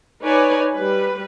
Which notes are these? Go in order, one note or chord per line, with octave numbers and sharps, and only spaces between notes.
D#4 B4 C#5 D5 G#5
G3 B4